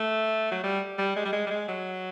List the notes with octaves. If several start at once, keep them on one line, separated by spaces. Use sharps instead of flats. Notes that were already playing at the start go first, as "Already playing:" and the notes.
Already playing: A3
F#3
G3
G3
G#3
G3
G#3
G3
G#3
F#3